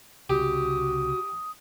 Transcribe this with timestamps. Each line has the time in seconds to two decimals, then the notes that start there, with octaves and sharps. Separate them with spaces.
0.30 C2 C#3 F#4 G4 D#6